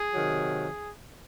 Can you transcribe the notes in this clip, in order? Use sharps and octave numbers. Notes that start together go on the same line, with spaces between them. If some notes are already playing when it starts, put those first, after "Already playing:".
Already playing: G#4
C3 D#3 F#3